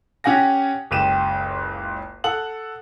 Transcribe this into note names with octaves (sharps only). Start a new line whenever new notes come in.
C#4 G4 F#5 G#5 A#6
F#1 C#2 G4 D#7 E7
A4 F#5 F#7